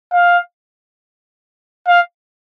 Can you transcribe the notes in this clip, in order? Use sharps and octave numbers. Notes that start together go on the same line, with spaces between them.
F5
F5